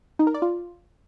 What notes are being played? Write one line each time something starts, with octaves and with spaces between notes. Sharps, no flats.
D#4
A#4
D5
F4